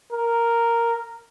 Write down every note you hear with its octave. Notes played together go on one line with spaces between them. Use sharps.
A#4